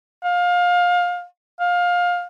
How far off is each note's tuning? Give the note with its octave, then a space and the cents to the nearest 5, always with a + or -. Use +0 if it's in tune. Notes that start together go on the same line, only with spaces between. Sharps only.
F5 +25
F5 +20